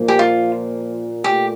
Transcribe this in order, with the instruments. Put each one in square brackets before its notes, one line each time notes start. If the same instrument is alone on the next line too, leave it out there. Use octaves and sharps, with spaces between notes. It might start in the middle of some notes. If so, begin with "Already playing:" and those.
Already playing: [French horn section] A#2 F3 A#3
[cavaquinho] G4
F4
[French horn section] A#2 A3 [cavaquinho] G4